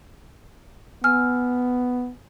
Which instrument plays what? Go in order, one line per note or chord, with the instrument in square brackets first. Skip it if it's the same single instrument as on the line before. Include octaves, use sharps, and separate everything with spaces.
[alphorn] B3 [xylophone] G#5 E6 F6